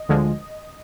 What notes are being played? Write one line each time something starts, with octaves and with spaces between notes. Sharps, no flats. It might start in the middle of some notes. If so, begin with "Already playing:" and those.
Already playing: D#5
D2 D3 F3 G#3